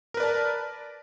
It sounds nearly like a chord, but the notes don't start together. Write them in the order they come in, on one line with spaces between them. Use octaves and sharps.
A#4 B4 D5 A5